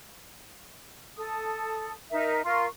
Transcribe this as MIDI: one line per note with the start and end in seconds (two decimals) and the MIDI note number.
1.17 1.92 69
1.17 1.92 87
2.11 2.41 63
2.11 2.41 70
2.11 2.41 76
2.45 2.66 65
2.45 2.66 70
2.45 2.66 84
2.45 2.66 85